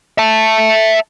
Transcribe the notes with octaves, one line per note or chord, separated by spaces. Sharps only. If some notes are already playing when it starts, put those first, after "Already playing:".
E5 A5